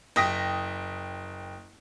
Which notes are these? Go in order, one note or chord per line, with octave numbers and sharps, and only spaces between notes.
F#1 G5 D#6 A#6 B6